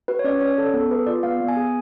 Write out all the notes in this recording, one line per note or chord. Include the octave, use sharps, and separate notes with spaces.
F#4 B4
C#5
C#4 D5
C#4 C#5
A4
B3 A4
G#4 B4
F4 D5
B3 F5
B3
G#5
G#4